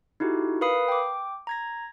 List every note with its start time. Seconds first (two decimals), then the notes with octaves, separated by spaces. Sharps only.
0.20 D#4 E4 F#4 G4 A4
0.61 A#4 B4 F5 B5 D#6 C7
0.88 G5 D6
1.47 A#5 G#6 A#6